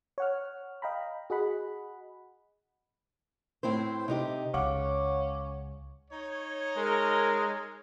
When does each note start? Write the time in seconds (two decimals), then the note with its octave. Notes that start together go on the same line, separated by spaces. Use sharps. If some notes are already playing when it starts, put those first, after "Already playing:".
0.18 C#5 F#5 F6
0.82 D#5 F5 G5 A#5 B5
1.30 F#4 G#4 D#5 F#5 B5
3.63 A2 C4 E4 C5
4.08 C3 D#4 G4
4.54 C#2 C#4 F5 F#5 D6
6.11 D#4 C#5
6.77 G#3 A#4